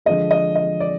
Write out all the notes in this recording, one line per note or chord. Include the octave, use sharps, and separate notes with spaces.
D3 F3 G#3 D#5
D#5
D#5
D5